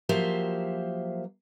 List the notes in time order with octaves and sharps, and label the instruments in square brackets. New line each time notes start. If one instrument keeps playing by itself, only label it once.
[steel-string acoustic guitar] F3 F#3 A#3 G4 C5 E5